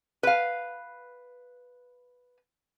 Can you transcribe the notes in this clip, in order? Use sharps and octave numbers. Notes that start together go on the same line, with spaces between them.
B4 F5